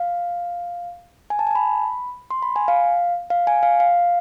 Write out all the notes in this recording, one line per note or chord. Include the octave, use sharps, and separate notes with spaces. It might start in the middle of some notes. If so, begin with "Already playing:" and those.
Already playing: F5
G#5
A5
G#5
A5
B5
C6
B5
G#5
F5
F5
G#5
F5
F5